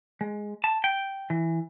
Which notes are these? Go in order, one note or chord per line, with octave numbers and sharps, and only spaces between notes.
G#3
A5
G5
E3